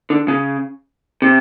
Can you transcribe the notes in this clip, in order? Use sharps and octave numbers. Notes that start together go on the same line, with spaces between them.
D3
C#3
C3